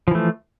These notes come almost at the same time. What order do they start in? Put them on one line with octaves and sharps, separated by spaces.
F3 E3 A3